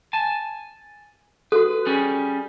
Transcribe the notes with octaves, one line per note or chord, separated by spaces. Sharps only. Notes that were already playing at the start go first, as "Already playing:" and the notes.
G#5 A5
F#4 A4 B4
G3 C#4 G#4